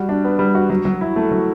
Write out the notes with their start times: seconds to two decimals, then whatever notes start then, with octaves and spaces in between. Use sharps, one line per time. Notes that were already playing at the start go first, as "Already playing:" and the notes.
Already playing: G3 F#4
0.09 D4
0.24 B3
0.39 G3
0.55 F#4
0.70 F#3
0.85 F#3
1.01 E4
1.16 A3
1.31 F#3